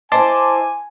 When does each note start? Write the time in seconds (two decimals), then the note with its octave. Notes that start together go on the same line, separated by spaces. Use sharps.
0.12 E4 C5 D#5 G#5 A5 C6 D6